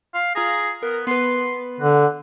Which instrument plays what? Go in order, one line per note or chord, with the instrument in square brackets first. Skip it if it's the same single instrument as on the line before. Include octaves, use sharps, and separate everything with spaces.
[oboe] F5
[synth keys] F4 A#5 A#6 [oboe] G#4
[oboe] B3 [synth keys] A#4
[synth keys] B3 B4 [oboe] C6
[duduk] D3 [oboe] F#5